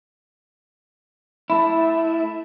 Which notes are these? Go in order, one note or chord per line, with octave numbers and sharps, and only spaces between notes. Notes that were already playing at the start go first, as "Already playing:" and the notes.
A3 E4